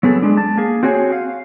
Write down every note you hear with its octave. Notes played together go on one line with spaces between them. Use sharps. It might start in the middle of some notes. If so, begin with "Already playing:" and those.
F#3 B3 G#4 A4
G#3 D4
A5
A#3 G#4
C4 F#4 G#4 C#5 G#5
F5